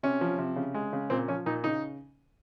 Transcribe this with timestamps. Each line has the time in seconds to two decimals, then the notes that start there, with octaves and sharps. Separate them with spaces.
0.03 C3 C#4
0.21 F3
0.39 C3
0.56 C#3
0.74 G#3
0.93 C#3
1.10 A#2 C4
1.28 F3 C#4
1.46 A#2 D#4
1.64 C#3 D#4